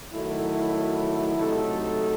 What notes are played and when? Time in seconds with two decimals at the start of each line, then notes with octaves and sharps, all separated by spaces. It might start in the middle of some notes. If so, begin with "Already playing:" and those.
0.13 D#3 F#3 A3 E4
1.37 C3 F#3 A3 D#4 A4